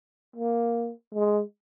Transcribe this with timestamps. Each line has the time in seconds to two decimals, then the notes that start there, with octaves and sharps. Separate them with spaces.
0.36 A#3
1.14 G#3